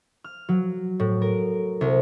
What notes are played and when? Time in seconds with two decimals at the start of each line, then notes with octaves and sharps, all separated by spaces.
0.24 F6
0.49 F#3
1.00 A2
1.22 A#4
1.81 C2